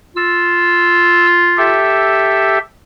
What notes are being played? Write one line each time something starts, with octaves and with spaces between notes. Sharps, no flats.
F4 E6
G4 A4 E5